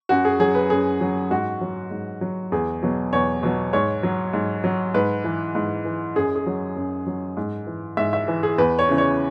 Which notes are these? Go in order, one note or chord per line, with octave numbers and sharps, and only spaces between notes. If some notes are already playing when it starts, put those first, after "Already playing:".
F#2 F#4
G#4
F#3 G#4
B4
F#2 G#4
F#3
G#2 F#4
F#3
G#2
F#3
E2 G#4
B2 F#3
E2 C#5
B2 F#3
G#2 C#5
F#3
G#2
F#3
G#2 B4
E3
G#2
E3
F#2 G#4
G#4
F#3
F#2
F#3
G#2
E3
G#2 E5
E5
E3
G#4
E2 B4
C#5
C#3 E3
C#5